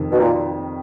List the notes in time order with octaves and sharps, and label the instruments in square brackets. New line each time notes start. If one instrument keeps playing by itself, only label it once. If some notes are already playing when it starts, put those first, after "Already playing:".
Already playing: [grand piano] F2 C3 D#3
[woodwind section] B2
A#2